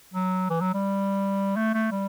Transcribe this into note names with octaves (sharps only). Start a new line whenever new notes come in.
F#3
E3
F#3
G3
A3
A3
G3